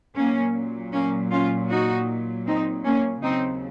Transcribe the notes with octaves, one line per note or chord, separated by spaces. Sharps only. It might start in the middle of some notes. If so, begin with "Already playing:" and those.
A#2 F#3 A#3 C#4
A#3 C#4
C#4 F4
D#4 F#4
C4 D#4
A#3 C#4
D#2 C#3 F#3 C4 D#4